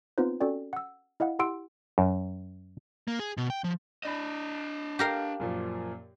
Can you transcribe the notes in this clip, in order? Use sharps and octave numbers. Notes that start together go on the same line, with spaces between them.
B3 C4 D#4 F4 B4 C5
C#4 F#4 A4 D5 G5
F#5 E6
E4 D#5 F5 F#5
E4 G4 F#5 C6 E6 D7
F#2
A#3
G#4
B2
G5
F3
D4 D5 D#5 B5
G4 A#4 F5
F#2 A#2 F3